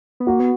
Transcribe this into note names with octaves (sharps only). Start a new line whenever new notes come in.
B3
A#3 F#4
B3